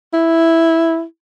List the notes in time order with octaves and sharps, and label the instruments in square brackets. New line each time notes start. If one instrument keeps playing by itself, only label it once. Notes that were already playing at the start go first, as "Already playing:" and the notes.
[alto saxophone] E4